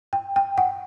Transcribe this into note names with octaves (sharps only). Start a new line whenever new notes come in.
G5
G5
F#5